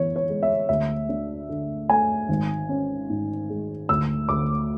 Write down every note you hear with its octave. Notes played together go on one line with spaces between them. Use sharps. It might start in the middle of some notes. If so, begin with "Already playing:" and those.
Already playing: E3 B3 C#5
C#5
G#3
E5
D2 E5
D4
D3
A3 G#5
G#1
C#4
G#2
G#3
D2 E6
D2 D6